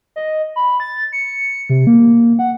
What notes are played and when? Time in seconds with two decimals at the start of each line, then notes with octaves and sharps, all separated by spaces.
0.16 D#5
0.56 B5
0.80 A6
1.13 C#7
1.69 C3
1.87 A#3
2.39 F#5